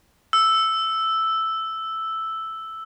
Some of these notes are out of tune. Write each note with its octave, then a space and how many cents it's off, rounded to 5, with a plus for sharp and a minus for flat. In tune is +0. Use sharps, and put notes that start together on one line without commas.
E6 +0